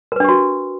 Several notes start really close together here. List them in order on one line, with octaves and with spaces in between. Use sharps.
A#4 B4 D4 G4 F#4